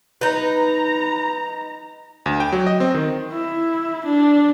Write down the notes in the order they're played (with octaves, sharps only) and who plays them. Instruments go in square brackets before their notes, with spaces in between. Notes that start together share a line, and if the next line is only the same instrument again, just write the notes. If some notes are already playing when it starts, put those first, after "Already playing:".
[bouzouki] D#4 B4 [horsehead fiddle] A#5
[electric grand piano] D2
G5
F#3
D#5
C4
D#3
[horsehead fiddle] E4
D4